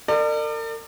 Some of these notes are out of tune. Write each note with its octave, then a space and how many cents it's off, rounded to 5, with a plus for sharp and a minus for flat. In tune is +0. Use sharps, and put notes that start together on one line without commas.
A#4 -40 D5 +35